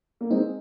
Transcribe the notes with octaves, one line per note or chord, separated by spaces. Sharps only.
A#3
G#3 C4 D#4